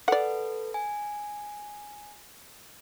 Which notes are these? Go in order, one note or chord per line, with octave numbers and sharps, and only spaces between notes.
A4 B4 D5 F#5
G#5